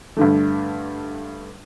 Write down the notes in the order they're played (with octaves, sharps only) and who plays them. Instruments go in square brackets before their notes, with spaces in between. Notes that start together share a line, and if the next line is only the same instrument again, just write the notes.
[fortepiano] G2 D3 A3